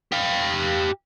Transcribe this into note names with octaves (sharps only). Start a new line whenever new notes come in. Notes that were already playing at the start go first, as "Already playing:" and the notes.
G4 F5